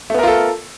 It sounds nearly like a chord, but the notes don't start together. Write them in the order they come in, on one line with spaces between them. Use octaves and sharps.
A3 B3 A#4 F4 A4